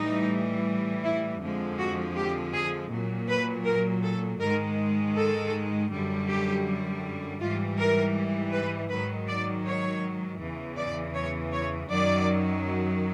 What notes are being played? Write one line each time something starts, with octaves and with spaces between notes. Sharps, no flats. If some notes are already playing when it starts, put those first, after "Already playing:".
Already playing: A2 E3 G3 D#4
E4
F2 D3 F3 G#3
F#4
G4
G#4
A#2 F#3
B4
A#4
A4
G#2 D#3 G#3 A#4
A4
F#2 D3 G3
G4
G#2 E3 G3 F4
A#4
B4
G#2 D#3 F#3 B4
D5
C#5
E2 C#3 E3
D5
C#5
C#5
F#2 D#3 F#3 D5